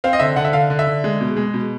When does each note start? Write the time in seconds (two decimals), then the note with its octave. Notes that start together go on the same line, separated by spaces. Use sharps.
0.04 C4 F5
0.13 D#5
0.20 D3 E5
0.36 D3 F#5
0.45 E5
0.53 D3 F5
0.70 D3
0.79 E5
0.87 D3
1.04 G#3
1.21 B2
1.36 G#3
1.54 B2